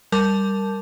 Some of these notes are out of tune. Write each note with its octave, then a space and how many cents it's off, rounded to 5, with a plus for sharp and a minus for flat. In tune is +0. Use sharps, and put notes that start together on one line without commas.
G3 +0 A#4 -10 A5 -5